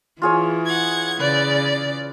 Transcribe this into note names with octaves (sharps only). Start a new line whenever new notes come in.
E3 F4 G#4 C#5
F#5 G#6
C#3 B4 D5